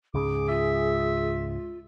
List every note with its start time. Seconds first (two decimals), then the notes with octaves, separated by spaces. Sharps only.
0.14 C#2 G#2 C#3 G#4 D6
0.48 F4 E5